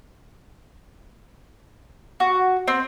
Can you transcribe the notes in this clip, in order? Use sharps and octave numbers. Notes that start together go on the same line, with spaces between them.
F#4
C4